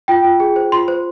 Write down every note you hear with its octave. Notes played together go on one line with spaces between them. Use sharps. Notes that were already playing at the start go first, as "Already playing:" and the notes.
F4 G5
F4
G#4
C5
F4 C6
C5